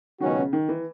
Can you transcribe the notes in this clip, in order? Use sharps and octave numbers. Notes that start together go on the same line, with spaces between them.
C#2 B2 D#3 F#3 C#4 F#4
C#3
D#3
E3